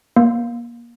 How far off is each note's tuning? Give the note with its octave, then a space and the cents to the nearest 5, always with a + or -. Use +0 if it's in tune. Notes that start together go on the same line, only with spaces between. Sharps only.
A#3 +25